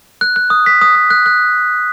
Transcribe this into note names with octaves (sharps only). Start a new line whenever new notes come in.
F#6
F#6
D#6
B6
D#6
D#6
F#6
F#6